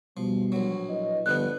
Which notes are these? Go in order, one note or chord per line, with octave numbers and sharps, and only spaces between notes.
B2 F3 G3
A#1 F#3
E4 B4 D#5
G1 D3 F3 B3 F#6